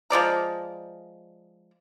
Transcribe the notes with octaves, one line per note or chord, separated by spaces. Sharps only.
F3 G#3 D5 A#5